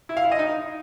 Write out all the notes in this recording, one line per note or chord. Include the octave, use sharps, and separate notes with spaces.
E4
F5
E4
D#5
D#4